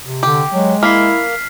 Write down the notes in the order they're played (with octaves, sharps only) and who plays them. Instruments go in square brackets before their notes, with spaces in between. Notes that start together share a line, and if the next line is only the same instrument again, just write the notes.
[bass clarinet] C3
[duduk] D3 [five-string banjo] G4
[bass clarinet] F#3 [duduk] G#3
[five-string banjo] A#3 [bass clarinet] E4 [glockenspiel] F6 B6 C7